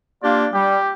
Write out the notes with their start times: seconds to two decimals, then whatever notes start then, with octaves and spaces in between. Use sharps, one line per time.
0.22 A#3 D4 F4 G4 D5
0.53 G3 G4